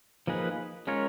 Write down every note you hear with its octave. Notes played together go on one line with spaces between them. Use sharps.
F3 A#3 D#4 G#4 B4
G#3 C#4 F4 A#4 C#5